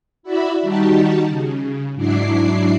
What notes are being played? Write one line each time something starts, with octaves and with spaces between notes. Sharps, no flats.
E4 F#4 D5 E5 B5
D#3 G3 D#4 F#4 G4 A5
C#3
G#2 F#3 D4 E4 D6 C7